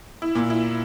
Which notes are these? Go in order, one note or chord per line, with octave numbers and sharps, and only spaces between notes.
E4
A#2
E4